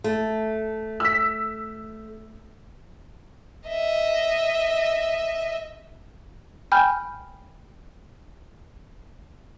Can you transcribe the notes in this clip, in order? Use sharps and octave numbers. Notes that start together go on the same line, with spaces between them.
A3
E6 B6
D#5 E5
G5 G#5 B5 F6 G6